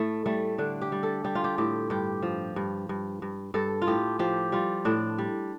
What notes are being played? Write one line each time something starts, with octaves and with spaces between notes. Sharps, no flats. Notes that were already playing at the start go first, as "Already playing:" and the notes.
Already playing: A2 A3
G3 A3
D3 D4
G4
G3
A4
G3 G4
F4
G4
A2 G4
G2 G4
F3
G2
G2
G2
G2 A4
F4
A2 G4
F3 G4
G3 F4
A2 D4
G3